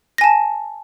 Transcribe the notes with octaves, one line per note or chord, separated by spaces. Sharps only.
G#5 A5 A#6